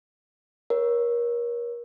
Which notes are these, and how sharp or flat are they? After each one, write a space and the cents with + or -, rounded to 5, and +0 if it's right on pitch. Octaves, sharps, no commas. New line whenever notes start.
A#4 +30 C#5 +0